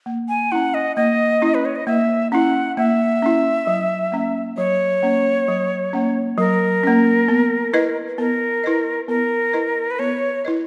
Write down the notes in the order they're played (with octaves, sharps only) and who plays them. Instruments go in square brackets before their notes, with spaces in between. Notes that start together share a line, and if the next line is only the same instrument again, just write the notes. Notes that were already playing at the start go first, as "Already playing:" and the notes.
[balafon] A#3
[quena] G#5
[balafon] C#4 E4 [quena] F#5
[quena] D#5
[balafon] A#3 [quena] D#5
[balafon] C#4 E4
[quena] B4
C#5
D#5
[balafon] A#3 [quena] E5
[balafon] C#4 E4 [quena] F#5
[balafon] A#3 [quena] E5
[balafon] C#4 E4
F#3
A#3 C#4
[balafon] F#3 [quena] C#5
[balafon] A#3 C#4
F#3
A#3 C#4
[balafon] F#3 [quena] A#4
[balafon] A#3 C#4
B3
E4 B4 D#5
[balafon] B3 [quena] A#4
[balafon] E4 B4 D#5
[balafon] B3 [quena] A#4
[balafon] E4 B4 D#5
[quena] B4
[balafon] B3 [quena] C#5
[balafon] E4 B4 D#5